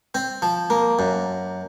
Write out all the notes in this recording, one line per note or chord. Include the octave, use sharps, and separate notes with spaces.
C4
F3
A#3
F#2